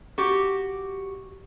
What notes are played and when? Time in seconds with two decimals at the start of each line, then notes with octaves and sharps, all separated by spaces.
0.18 F#4 G4